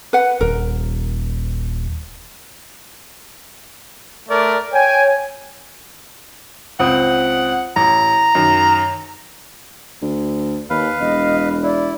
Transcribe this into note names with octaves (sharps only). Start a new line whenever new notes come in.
B4 F#5
D#1 A#4
A3 A#4 D5
C#5 G5 G#5
C#2 C4 F#5 D#6
A1 A#5
F#2 D#3
D2
D#2 B4 F5
E1 D#5
E4 D5